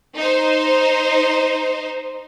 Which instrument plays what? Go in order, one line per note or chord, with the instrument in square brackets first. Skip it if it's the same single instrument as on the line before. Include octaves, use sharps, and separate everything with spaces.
[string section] D#4 C5